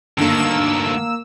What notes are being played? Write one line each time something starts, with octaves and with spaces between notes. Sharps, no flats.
D2 G2 D3 D#3 A#3 E6